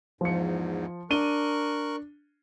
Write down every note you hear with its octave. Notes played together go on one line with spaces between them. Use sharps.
E2 G#2 F3 C#7
D4 A#4 C#6 F#6 D#7 G7